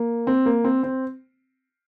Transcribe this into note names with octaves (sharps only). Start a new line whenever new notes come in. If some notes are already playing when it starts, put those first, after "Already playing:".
Already playing: A#3
C4
A#3
C4
C4